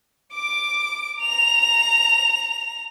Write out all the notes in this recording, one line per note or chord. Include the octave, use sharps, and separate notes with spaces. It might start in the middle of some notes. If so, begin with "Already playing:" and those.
D6 D7
A#5 F7